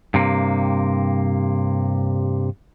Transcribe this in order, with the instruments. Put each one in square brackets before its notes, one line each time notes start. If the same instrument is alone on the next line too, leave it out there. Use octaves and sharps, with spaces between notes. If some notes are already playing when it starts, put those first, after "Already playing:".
[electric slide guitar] G2 C3 A#3